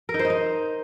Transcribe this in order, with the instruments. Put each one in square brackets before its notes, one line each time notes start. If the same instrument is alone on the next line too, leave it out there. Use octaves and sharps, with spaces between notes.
[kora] A#4
D#4
C5
D#5
D#4